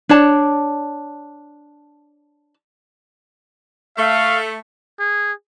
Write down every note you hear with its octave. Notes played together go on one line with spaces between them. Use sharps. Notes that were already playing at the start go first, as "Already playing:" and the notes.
D4 C#5 A5
A3 F5
G#4